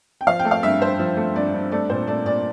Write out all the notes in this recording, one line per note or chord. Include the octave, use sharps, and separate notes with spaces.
G5
F3 F5
G5
A3
F5
G2 E5
G2 C5
F3
A3
G2 D5
G2
A3 D5
A#2 C5
A3 D5
A#2 D5